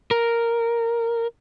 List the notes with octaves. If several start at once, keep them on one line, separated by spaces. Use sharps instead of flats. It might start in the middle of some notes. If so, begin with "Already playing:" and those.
A#4